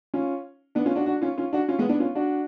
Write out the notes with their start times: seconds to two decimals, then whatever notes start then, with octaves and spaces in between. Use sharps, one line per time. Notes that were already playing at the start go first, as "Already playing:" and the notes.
0.14 C#4 F4
0.75 B3 D4
0.86 C#4 F4
0.96 D4 F#4
1.06 D4 F#4
1.22 C#4 F4
1.38 C#4 F4
1.53 D4 F#4
1.68 C#4 F4
1.79 G#3 B3
1.89 B3 D4
2.00 C#4 F4
2.15 D4 F#4